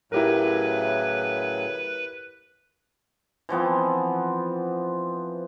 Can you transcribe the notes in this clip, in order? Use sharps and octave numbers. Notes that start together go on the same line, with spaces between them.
A2 C#3 F#3 E4 G4 A#4 B4
E3 F3 B3 C4